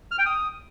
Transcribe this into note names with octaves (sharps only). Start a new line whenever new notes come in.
F6
G5
D#6